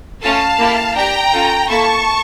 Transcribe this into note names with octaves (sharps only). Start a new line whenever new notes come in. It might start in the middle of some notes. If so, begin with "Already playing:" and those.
A3 C#4 F4 A4 F5 A5
A#3 E4 G4
D4 G4 G5 A#5
C#4 F4 A4
A#3 E4 A4 A5 C#6